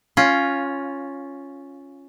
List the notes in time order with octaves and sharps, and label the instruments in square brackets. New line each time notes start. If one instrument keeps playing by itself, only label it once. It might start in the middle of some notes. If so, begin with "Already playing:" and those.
[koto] C#4 F4